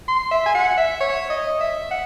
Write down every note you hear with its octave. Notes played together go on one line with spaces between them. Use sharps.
C6
E5
G#5
F#5
E5
C#5
D#5
E5
F#5